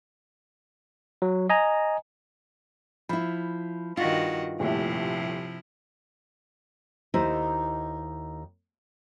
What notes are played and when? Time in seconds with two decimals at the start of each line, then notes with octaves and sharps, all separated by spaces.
1.22 F#3
1.50 D#5 G#5 A#5
3.09 F3 E4 B5
3.97 G2 D#3 F4 F#4
4.60 D#1 A2 C3 F3 E4
7.14 D#2 D#4 E4 C5 D#5